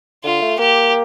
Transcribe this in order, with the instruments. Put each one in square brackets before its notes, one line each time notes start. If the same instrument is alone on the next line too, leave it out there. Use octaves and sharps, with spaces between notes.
[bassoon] D3 [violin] F4
[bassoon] A3
[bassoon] A#3 [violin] G4